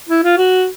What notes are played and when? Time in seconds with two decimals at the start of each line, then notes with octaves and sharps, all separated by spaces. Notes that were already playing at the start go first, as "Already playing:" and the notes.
0.09 E4
0.24 F4
0.37 F#4